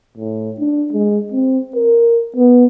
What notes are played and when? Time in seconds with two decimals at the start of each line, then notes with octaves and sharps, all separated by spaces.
0.18 A2
0.58 D4
0.92 G#3
1.32 C4
1.76 A#4
2.36 B3